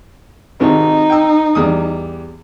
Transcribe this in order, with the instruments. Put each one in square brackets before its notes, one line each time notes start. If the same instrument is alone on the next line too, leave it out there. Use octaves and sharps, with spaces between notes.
[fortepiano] G#1 C3 D#3 [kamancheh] D#4
[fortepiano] G5 E6
E2 G3 D#6